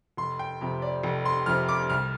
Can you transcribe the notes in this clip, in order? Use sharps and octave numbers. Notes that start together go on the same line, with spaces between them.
F1 C6
G5
F2 C3
D5
F1
C6
F2 C3 F6
D6
C2 F6